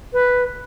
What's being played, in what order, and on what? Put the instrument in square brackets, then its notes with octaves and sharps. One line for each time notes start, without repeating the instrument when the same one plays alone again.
[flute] B4